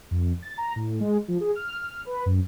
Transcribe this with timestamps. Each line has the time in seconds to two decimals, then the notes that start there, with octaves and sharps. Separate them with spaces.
0.11 F2
0.42 A6
0.58 A#5
0.76 A2
1.00 G#3
1.28 F3
1.40 G#4
1.55 F6
1.87 F6
2.05 B4
2.26 F#2